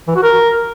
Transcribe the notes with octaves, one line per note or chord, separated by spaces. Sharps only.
E3
F#4
A#4